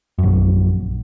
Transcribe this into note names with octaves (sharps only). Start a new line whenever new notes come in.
A#1 F#2